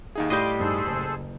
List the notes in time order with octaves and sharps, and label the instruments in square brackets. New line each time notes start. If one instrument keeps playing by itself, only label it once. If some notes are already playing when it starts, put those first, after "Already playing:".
[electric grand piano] D#2 D#4 G#4 [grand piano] E5 F5
[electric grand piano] A2 D#6 G6 [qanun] G3 D#5 [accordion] C6 D6
[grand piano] G2 D#4 [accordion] G#4 A4 C5
[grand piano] F#1